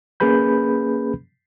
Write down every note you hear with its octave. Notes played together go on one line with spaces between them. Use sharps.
A#3 C#4 G#4 B4 B5 G6